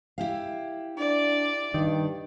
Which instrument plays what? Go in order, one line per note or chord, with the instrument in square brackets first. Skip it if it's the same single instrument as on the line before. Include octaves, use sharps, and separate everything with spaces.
[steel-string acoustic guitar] E4 G4 F5
[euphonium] D4 [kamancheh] D5
[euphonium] G2 [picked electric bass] D#3